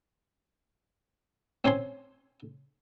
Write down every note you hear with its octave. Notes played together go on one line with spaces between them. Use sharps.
C4 C#4 G#5 C6